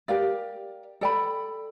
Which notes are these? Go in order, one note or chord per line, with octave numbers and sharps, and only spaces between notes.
G4 A#4 D5 F5
A4 D5 G5 B5